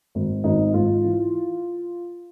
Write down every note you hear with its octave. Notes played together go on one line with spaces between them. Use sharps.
G#1
G#1 D#4
G#2 F4
E3